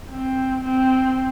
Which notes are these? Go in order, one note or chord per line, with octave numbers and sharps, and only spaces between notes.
C4
C4